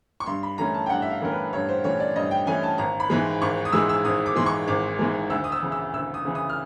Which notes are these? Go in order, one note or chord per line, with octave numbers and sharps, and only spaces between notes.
C#6
G2 C6
B5
E3 A3 C#4 A#5
A5
G5
G2 F#5
E5
F5
E3 A3 C#4 A#4
B4
G2 C#5
C5
E3 A3 C#4 C#5
D5
G2 D#5
G5
E3 A3 C#4 G#5
A5
G#1 A#5
B5
G#2 E3 G#3
G#1 C#6
D#6
G#2 E3 G#3 E6
E6
G#1 D#6
D6
G#2 E3 G#3 C6
C#6
G#1 D6
G#2 E3 G#3
D2 E6
D#6
E6
C#3 E3
E6
D2 E6
D#6
C#3 E3
D#6
F6